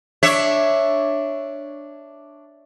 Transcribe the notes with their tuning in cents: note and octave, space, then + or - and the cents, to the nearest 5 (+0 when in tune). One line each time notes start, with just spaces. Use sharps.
D4 +0 C#5 +0 E5 +0